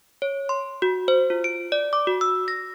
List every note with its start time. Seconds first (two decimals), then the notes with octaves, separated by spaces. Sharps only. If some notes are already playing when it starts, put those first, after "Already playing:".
0.22 C#5
0.49 C6
0.82 F#4
1.08 C5
1.30 F4
1.44 D7
1.72 D5
1.93 D6
2.07 F#4
2.21 E6
2.48 A#6